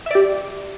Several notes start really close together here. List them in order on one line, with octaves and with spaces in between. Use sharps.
E5 D5 G4